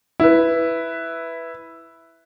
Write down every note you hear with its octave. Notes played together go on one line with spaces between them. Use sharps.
E4 B4